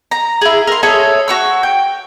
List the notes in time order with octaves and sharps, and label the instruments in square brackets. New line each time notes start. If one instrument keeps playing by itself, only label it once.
[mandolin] A#5
E4 G#4
A#4 C6
G#4 A4 C#5 E5
F#4 C#6 E6
G5